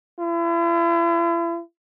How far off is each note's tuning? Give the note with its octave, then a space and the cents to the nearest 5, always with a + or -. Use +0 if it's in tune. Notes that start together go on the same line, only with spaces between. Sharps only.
E4 +40